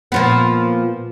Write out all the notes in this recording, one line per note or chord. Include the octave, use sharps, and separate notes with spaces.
A#2 F3 B3